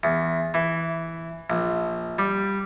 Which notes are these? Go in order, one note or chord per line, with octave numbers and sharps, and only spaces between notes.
E2
E3
A#1
G3